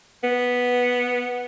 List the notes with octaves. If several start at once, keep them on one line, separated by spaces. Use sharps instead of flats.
B3